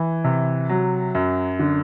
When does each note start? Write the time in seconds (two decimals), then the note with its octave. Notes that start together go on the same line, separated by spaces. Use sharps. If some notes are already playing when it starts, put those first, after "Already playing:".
Already playing: E3
0.24 C3
0.69 F#3
1.15 F#2
1.59 D3